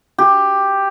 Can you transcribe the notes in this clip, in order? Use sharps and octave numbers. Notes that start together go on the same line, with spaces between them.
G4